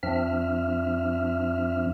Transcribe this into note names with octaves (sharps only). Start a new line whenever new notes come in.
F2 F3 C4 D4 E5 F6